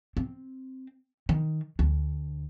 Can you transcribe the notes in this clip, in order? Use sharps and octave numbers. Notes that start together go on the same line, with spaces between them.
C4
D#3
D2